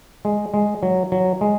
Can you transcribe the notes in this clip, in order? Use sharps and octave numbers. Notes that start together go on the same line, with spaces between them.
G#3
G#3
F#3
F#3
G#3